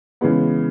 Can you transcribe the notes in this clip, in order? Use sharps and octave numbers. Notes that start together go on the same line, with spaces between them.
C#3 E3 G#3 B3